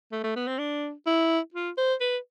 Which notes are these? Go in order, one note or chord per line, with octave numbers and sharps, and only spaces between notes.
A3
A3
B3
C4
D4
E4
F4
C5
B4